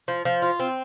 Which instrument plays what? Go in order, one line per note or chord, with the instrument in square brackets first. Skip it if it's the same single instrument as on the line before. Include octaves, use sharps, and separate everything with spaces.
[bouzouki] F3
F3
F4
C4